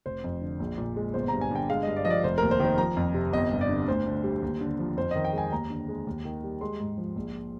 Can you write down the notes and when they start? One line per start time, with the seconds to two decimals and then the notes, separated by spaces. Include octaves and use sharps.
0.06 F1 C5
0.24 F2
0.41 D3
0.60 A#1
0.78 A#2
0.96 G#3
1.14 G1 C5
1.28 G2 A#5
1.41 G#5
1.51 D3 G5
1.69 G#3 F5
1.83 G2 D#5
1.96 D5
2.05 F3 D#5
2.10 D5
2.24 F1 C5
2.38 D#2 A#4
2.51 C5
2.60 D#3
2.65 C5
2.78 F3 A#5
2.97 F2
3.14 C3
3.33 G1 D#5
3.51 G2
3.61 D5
3.69 D3
3.87 D2 C5
4.07 D3
4.24 G3
4.42 D#2
4.61 D3
4.79 F3
4.97 F2 C5
5.11 D#3 D#5
5.25 G5
5.33 G#3 G#5
5.52 D#2 A#5
5.70 D3
5.89 G#3
6.07 D#2
6.25 D#3
6.43 G3
6.61 G#3 C6
6.80 G#2
6.98 F3
7.16 A#1